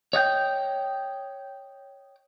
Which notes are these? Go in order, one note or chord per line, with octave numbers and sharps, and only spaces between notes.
C#5 D#5 F#5 G5